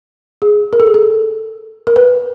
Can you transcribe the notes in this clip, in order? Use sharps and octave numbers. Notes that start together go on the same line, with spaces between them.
G#4
A#4
A4
G#4
A4
A#4
B4